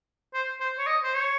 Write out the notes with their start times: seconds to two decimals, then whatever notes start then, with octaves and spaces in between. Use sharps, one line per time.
0.34 C5
0.61 C5
0.78 C#5
0.87 D#5
1.03 C5
1.14 C#5